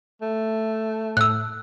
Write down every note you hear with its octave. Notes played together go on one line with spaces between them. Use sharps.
A3
A2 E6 F#6